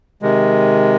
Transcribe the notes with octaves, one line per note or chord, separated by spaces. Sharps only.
C3 D#3 G#3